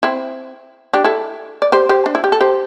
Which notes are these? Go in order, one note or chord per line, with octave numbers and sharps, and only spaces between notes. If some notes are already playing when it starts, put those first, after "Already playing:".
C4 E4
D4 G4
E4 A4
D5
G4 C5
G4 C5
D4
E4
G4
A4
G4 C5